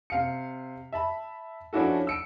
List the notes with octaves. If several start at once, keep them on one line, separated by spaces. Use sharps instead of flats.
C3 F5 C#7
E5 A5 B5
F3 C#4 D4 E4 F#4 A4
E6 C#7 D7